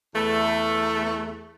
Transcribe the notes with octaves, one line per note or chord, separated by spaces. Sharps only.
E2 A3